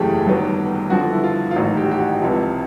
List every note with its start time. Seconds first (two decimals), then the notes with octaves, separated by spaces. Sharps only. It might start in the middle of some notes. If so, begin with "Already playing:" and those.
Already playing: F#1 E2 C#3 E3 A3 G4 G#4
0.26 G1 G2 D#3 F#3 B3
0.90 G1 G2 D3 F3 F#4
1.12 E4
1.23 F4
1.51 F4
1.55 A1 G#2 D#3 F#3 F#4
1.77 G4
1.84 F#4
1.91 G4
1.99 F#4
2.20 C#2 C3 F3